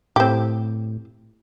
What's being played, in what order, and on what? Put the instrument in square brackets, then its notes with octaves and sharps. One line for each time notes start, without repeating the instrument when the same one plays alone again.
[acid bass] A2 [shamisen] C4 G4